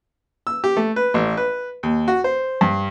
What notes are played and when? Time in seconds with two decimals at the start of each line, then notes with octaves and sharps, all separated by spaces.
0.47 E6
0.64 G4
0.77 A3
0.96 B4
1.14 A1
1.37 B4
1.83 D#2
2.08 F#4
2.24 C5
2.61 G2